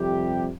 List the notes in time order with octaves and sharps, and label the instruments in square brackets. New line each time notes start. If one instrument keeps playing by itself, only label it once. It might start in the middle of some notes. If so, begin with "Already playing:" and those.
Already playing: [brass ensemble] F2 C3 G3 G4